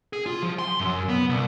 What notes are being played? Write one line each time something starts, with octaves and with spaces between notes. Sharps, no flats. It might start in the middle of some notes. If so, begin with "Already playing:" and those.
G#4
F4
F3
C6
F#2
B3
C2